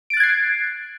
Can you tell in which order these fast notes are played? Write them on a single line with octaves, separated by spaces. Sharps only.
D7 A6 F#6 G#6 C7